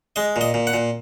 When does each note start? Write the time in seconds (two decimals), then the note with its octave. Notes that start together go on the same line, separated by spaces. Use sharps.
0.16 G#3 D#5
0.36 A#2
0.41 D#5
0.54 A#2
0.67 F#5
0.73 A#2